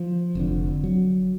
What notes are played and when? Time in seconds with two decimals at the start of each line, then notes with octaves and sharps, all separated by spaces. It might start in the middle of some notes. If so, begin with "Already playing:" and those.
Already playing: F3
0.35 F1 F2 D3
0.84 F#3